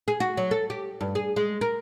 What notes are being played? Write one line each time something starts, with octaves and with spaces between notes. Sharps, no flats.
G#4
F#4
F#3
A4
G4
G2
G#4
G#3
A#4